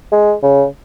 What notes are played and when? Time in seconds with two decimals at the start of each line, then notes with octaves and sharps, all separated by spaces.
0.12 G#3
0.43 C#3